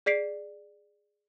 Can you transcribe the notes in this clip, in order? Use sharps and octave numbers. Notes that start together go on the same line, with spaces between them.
G#4 D5 B6 C7 D7